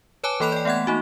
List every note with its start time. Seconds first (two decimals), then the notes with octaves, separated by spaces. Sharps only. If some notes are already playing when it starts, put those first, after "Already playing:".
0.24 B4 C#5 G#5 A5 D6
0.40 E3 A#3 A4 B5 F#6 F7
0.52 D5 G5
0.65 A3 B3 F#5 F#6 G#6
0.87 A#3 D#4 F#4